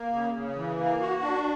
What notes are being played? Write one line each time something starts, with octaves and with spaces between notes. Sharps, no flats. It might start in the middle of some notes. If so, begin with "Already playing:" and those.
Already playing: A#3
C#3
C#3
E3
A#3
F#4
D4